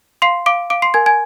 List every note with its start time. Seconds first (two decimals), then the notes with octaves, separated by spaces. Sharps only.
0.22 F5 C6 C7
0.46 F5 D6 D7
0.70 F5 D6 D7
0.82 C6 C7
0.94 A#4 G#5 G#6
1.06 G#5 G#6